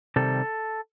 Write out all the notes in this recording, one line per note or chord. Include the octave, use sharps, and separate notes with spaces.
C3 D#3 G3 A4